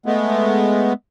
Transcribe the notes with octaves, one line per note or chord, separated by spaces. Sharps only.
G#3 A3 B3